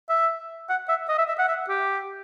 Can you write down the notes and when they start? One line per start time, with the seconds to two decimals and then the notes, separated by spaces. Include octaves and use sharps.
0.09 E5
0.69 F#5
0.89 E5
1.09 D#5
1.18 E5
1.28 E5
1.39 F#5
1.48 E5
1.69 G4